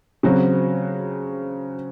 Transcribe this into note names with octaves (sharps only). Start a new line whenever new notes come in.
C#3 F#3 C4 F#4